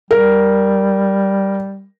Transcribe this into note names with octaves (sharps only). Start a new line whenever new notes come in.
G3 A#4